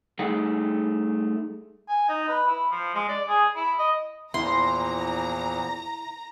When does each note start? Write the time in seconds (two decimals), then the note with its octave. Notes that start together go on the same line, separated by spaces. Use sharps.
0.19 G3 A3 D#4 G#4 F#5 G5
1.88 G#5
2.09 D#4
2.28 B4
2.47 E4
2.71 F3
2.95 G#3
3.09 D5
3.28 G#4
3.56 E4
3.79 D#5
4.34 E2 A#2 F3 E4 A#5 C6